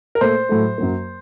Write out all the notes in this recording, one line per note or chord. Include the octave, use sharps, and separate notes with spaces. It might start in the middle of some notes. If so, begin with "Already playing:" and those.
A#4
A#2 A3 C5
A2 F#3 A3
F#2 F#3 A#3